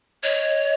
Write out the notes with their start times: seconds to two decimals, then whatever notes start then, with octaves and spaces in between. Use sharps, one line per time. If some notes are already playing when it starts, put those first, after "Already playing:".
0.23 C#5 D#5